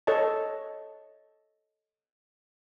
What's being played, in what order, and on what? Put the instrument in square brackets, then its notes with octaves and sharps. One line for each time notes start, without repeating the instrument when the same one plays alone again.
[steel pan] A4 C#5 D#5 A5